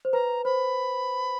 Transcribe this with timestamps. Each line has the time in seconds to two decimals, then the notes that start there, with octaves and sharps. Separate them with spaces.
0.05 C5
0.13 B4 A#5
0.45 C5 B5